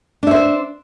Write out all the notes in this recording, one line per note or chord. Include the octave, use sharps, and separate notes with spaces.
D4 C5 E5